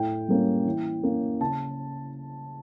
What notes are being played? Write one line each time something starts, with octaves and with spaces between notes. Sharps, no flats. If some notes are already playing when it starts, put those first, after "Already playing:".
Already playing: A2 G5
G3 A#3 C#4
E3
A#3 C#4
C#3 A5